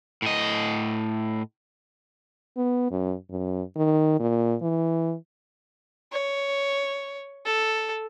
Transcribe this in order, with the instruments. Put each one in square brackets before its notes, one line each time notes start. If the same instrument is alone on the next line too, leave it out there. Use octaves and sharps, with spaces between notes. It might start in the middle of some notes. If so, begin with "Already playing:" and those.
[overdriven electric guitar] A2 D#5
[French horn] B3
F#2
F#2
D#3
A#2
E3
[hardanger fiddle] C#5
A4